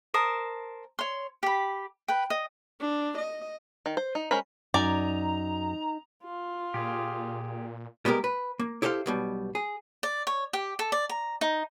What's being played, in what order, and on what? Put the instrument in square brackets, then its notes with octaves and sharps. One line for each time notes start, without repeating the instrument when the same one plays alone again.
[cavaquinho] A#4 C5 A5 D#6
C#5 C6
G4 B5
B4 G5
D#5
[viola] D4
D#5
[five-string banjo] D#3
C5
D#4
G#3 C#4 A#4 C5 B5
[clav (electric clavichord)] F#2 [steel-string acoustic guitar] D#4 [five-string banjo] D5 G#5 [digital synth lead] A#5
[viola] F4
[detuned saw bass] A#2 [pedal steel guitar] G4 G#4
[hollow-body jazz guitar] G3 G#3 B3 G4 A#4
B4
A#3
E4 G4 A4 C5 D5 F5
B1 B2 G3
G#4
[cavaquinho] D5
C#5
G4
A4
D5
A#5
D#4